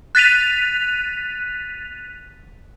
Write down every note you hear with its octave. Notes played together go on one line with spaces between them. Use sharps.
F#6 A6 B6 D#7 F7